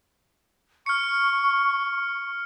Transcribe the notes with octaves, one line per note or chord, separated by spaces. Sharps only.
C#6 F6 C#7